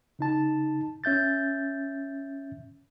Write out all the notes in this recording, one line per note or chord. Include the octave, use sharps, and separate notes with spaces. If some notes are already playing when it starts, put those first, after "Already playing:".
C#3 D#4 A5
C#4 E5 G6 A6